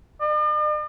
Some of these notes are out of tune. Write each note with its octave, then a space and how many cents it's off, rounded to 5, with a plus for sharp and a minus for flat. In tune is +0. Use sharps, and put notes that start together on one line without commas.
D5 +45